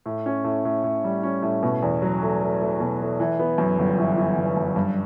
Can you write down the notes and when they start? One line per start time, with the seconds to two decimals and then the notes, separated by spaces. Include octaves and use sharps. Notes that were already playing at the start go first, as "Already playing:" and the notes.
0.06 A2
0.26 C#4
0.44 A2
0.65 A2
0.84 A2
1.04 G3
1.23 C#4
1.42 A2
1.63 B2
1.82 E2
2.02 F#3
2.22 A3
2.42 A3
2.61 A3
2.80 B2
3.00 A3
3.20 E3
3.39 B3
3.58 F#2
3.79 G1
3.98 E3
4.17 E3
4.37 G1
4.57 F#2
4.76 G2